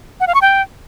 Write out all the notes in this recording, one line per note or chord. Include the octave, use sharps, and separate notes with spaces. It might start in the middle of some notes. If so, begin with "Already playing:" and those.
F#5
F5
C#6
G5